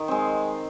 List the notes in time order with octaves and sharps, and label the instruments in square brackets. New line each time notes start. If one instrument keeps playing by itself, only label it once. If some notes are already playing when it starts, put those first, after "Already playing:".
Already playing: [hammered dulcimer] D#3
G#3 C4